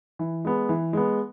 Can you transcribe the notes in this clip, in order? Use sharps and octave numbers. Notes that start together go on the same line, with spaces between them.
E3
G#3 B3
E3
G#3 B3